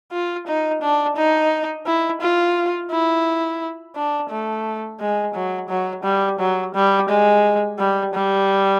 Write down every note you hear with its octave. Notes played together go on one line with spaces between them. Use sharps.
F4
D#4
D4
D#4
E4
F4
E4
D4
A3
G#3
F#3
F#3
G3
F#3
G3
G#3
G3
G3